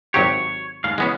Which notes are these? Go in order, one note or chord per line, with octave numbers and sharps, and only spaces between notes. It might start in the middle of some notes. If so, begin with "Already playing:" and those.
G#1 F#3 G4 C#5
D#2 G#2 F5
E3 G#3 B3 C#4